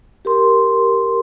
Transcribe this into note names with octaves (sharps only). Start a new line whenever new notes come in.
G4 A#4 C6